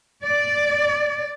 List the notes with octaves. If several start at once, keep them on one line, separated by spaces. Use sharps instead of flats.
D5